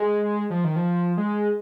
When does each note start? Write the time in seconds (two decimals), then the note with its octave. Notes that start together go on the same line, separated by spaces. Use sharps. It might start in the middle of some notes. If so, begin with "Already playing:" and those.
Already playing: G#3
0.50 F3
0.64 D#3
0.76 F3
1.17 G#3